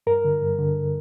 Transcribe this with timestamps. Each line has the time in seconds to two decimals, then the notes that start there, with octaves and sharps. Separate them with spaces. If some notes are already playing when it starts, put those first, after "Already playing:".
0.07 G2 A#4
0.25 D3
0.42 G2
0.59 D3